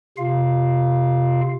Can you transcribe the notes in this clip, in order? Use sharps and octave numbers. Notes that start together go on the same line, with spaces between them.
C3 F4 F5